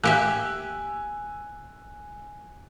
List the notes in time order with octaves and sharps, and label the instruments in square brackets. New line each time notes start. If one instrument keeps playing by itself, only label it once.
[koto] A#3 G4 E5 [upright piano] G#5 E6 F#6